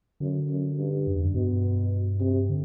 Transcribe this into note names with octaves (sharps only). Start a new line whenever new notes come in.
F#2 D3
F#2
G2
F#2
E2
F#2
G2 B2
C3
D3